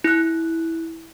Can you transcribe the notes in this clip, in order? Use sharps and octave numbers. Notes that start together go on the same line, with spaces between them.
E4 F#6